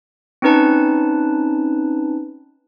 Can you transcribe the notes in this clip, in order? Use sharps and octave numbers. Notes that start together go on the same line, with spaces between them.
C4 C#4 D#4 B4 A5